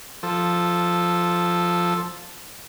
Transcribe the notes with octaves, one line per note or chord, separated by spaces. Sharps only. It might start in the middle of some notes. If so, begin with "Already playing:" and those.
F3 A4